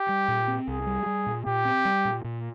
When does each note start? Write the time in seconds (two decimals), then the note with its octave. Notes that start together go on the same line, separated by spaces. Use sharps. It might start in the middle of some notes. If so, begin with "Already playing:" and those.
Already playing: G4
0.09 G3
0.28 A#2
0.48 C4
0.67 C2 G#4
0.86 G3
1.06 G3
1.26 A#2
1.46 A#2 G4
1.65 C4
1.85 G3
2.05 A#2
2.24 A#2